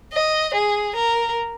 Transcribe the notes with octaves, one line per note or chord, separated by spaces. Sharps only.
D#5
G#4
A#4